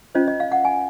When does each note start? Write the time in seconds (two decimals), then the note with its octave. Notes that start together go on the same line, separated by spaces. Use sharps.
0.15 C#4 F4 C5 D#5
0.28 D#5
0.40 F5
0.52 F#5
0.65 G#5